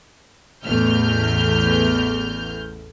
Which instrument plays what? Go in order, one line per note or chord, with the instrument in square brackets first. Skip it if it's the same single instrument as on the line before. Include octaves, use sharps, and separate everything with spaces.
[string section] A1 E2 A3 F6 G6